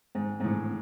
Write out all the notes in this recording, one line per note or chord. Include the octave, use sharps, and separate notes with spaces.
G#2
G#2
A2